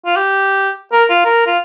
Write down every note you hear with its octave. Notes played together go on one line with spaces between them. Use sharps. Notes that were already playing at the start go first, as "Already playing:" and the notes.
F4
G4
A#4
F4
A#4
F4